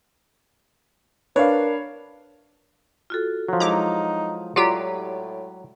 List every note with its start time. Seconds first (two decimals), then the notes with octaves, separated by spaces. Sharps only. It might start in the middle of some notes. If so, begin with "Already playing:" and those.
1.36 D4 A#4 B4 C#5 F5
3.10 F4 F#4 A4
3.48 F3 F#3
3.60 G#3 D#4 E4 G#4 A#5 D6
4.56 A2 F#3 F4 G4 D5 A#5